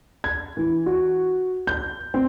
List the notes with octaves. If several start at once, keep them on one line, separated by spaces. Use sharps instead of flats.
G#6
E3
F#4
G6
C4